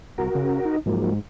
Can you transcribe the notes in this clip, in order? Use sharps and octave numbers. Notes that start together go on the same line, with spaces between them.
C2 F#4 A#4
C#3
D#4
G#2 F3 F#3 A#3